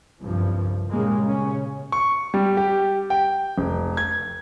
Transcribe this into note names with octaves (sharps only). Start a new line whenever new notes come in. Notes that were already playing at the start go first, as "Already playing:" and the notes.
F#1 C2 G2 F3
A#2 C#3 G3 G#3 A#3
A#2 C#3 C#4
C#6
G3
G4
G5
F1
G#6